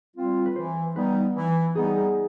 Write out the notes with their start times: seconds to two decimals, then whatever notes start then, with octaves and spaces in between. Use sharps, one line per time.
0.16 G3 C4 F4
0.46 B4
0.56 E3 C5
0.95 G3 B3 D#4 B4
1.35 E3
1.75 G3 B3 D#4 G#4